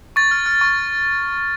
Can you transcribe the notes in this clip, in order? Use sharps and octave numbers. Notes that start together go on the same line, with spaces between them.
C#6 A6
F6
F6
C#6